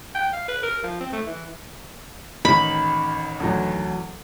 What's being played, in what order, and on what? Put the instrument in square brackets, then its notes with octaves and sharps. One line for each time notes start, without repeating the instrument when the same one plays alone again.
[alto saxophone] G5
F5
B4
A#4
F3
C4
A3
E3
[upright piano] A1 D#3 D#4 [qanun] B5
[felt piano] D2 E3 F#3